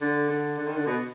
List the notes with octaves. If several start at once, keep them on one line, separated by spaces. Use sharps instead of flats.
D3
D3
D3
D#3
D3
B2